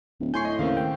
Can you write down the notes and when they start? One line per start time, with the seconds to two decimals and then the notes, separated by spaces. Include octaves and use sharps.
0.20 D1
0.34 A2 G#5 C6 C#6 G6 C7
0.45 D#5
0.59 D#2 C#3 A#3 C4 F5
0.77 G5